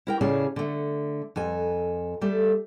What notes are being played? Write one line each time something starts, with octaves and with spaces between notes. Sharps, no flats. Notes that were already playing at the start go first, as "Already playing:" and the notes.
E4 A#4 G5
A2 C#3 C#4 G#4 D5 A5
D3 A3
F2 A4 G#5
G3 A3 A4